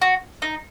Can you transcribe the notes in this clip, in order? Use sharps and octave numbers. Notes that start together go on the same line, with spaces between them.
F#4
D#4